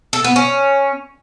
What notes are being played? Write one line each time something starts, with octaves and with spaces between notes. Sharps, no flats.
A4
B3
C#4